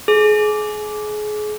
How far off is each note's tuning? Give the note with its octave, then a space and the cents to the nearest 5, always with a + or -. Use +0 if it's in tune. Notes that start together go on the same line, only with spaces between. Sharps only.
G#4 +30